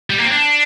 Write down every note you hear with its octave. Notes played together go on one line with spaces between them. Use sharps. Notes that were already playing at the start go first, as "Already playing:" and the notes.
G3
A#3
C4
D4